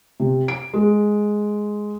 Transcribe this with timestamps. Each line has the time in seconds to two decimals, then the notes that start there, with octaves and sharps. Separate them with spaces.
0.20 C3
0.48 D7
0.74 G#3